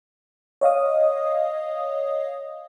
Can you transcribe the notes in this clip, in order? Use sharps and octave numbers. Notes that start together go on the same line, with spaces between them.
C#5 D#5 F5 D#6